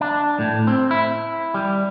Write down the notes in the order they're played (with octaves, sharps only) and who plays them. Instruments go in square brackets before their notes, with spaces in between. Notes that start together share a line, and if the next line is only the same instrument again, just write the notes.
[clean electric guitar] D4
A2
C4
E4
G3